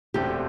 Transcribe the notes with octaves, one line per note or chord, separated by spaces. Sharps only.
E1 D2 D3 A3 C4 G4